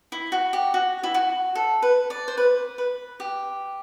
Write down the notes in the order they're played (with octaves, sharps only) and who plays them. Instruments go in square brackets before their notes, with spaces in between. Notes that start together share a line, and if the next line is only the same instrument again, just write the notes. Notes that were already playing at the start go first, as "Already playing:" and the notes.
[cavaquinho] E4
F#4
G4
F#4
E4
F#4
A4
B4
D5
C5
B4
B4
G4